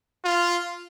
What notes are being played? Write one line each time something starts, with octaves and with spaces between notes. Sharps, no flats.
F4